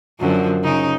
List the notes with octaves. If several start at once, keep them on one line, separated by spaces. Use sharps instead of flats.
F#2 D3 F3
C#3 D#4